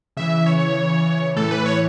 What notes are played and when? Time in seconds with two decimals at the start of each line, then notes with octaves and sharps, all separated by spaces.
0.17 C#3 E3 E5
0.46 C#5
1.36 A2 E3 A4
1.51 B4
1.66 C#5